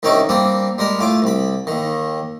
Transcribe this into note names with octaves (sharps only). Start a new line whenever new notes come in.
C2 D#3 C#4 D#4 E5 D6
G3 A#3 C4 D4
G3 G#3 A#4
A2 F4 D6
C2 B5
D#2 D#3